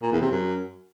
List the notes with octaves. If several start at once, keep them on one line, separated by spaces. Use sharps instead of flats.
A#2
E2
C3
F#2